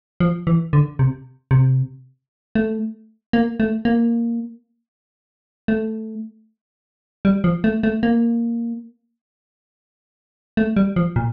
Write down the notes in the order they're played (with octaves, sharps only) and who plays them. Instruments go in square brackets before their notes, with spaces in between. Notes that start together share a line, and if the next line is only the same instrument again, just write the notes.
[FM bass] F3
E3
D3
C3
C3
A3
A#3
A3
A#3
A3
G3
F3
A3
A3
A#3
A3
G3
F3
A#2